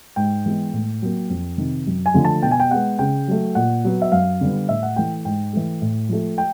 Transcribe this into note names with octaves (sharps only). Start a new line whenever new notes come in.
G#2 G5
E3 G#3 B3
A2
F#3 A#3
F2
C3 D#3
F#2
G#5
D3 F3 A3
A5
B2 G5
G#5
G5
G#3 B3 F#5
C#3 G5
F#3 A3
A#2 F#5
F#3 B3
E5
F#2 F5
D3 G3 B3
A2 E5
F#5
E3 A3 G5
G#2 G5
E3 A3
A2
F3 A3
G5